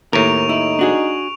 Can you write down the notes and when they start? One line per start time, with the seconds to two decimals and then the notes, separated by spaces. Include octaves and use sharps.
0.13 D#2 A2 A#4 C#6 D7 F7
0.49 D#4 E4
0.79 D4 F#4 G#4